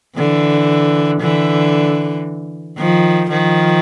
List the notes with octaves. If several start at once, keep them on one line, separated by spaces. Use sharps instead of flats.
D3 E3
D3 E3
D#3 F3
D#3 F3